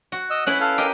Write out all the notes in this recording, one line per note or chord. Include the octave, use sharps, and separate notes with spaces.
F#4
D#5 E6
C#4 E4 B4 F#6
A4 F5
G4 A#4 D#5